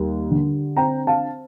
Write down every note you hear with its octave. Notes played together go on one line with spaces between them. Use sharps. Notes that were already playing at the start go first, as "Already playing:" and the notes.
Already playing: D#2 G3
D3
C4 G5 A#5
F5 A5